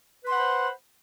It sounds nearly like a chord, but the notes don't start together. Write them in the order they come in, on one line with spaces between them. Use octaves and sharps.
B4 C6 F#5 B5 C5